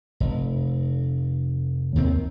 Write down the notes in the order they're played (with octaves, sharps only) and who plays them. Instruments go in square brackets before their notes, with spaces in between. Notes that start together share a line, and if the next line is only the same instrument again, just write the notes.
[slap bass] F1
D#2 D#3 C4